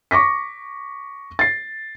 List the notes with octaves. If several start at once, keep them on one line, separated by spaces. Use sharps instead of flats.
C#6 D6 A#6 B6
A6 C7